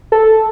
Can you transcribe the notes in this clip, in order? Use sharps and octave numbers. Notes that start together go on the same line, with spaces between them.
A4